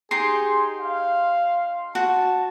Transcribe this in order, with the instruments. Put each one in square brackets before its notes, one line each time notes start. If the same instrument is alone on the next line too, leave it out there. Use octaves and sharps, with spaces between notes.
[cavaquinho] D#4 G4 [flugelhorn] G#4 [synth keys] C6
[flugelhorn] F5
[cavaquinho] F#4 [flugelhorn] A5